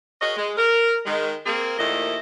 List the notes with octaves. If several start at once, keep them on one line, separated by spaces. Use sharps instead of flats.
F#4 G#4 A#4 C#5 D#5
G#3
A#4
D#3 G#3
A#3 C4 G#4
D#2 A#2 F3 A3 E4 D#5